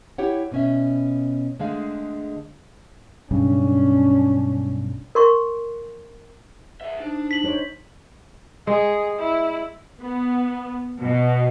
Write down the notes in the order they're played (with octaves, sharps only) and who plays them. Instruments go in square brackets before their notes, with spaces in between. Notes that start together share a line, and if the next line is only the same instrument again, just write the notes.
[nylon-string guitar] E4 G4 C#5 F#5
B2 C#4 E5
D3 G#3 A3 G#4 F5
[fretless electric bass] B1 G2 C#3 [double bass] C#4 D4
[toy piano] A#4 C6 C#6
[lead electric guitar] G#4 E5
[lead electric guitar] D4 [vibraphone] D#4 C5 A5
[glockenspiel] B6 F#7
[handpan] D#4 C5 C#5
[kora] G#3 [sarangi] G#4
[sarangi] E4
[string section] B3
B2